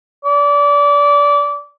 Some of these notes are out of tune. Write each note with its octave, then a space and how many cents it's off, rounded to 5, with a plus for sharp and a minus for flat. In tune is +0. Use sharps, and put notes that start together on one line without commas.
D5 -25